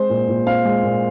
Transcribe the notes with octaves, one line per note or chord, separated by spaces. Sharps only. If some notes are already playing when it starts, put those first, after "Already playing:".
Already playing: G#3 C4 C5
A#2
A#2
C4 F5
G#3
A#2